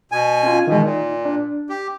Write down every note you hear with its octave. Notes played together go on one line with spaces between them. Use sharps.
B2 G#5
C#4 F4
B2 D#3 E3 G#3
A#2 D#4
D4
G4